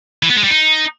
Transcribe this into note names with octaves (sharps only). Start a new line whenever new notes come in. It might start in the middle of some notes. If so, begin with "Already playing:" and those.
E3
B3
G#3
G3
D#4